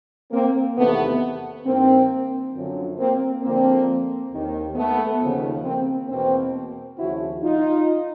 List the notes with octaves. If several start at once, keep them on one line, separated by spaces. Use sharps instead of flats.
A#3 C4
E2 C3 D#3 A3 B3
G2 D#3 A#3 C4
F#2 D3 F3
A#3 C4
F2 D3 F3 A#3 C4
D#2 D#3
A3 B3
D#2 C#3 F3
A#3 C4
E2 B2 A#3 C4
D#2 C#3 F3 E4 F#4
D#4 F4